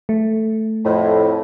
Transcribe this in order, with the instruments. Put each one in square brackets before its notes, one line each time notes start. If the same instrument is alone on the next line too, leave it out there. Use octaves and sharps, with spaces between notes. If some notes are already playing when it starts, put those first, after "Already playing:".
[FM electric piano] A3
[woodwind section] F2 A2